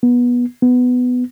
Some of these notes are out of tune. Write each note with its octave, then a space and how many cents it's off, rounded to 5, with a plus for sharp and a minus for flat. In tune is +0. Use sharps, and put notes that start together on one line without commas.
B3 -20
B3 +10